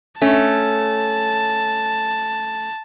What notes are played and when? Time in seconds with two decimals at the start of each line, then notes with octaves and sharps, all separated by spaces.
0.22 A3 C#4 A5